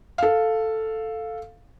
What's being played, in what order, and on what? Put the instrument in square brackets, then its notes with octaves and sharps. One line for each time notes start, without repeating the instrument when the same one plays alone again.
[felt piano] A4 F5